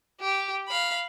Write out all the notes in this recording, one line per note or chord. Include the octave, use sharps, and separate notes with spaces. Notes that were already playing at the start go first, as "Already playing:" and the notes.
G4
F5 B5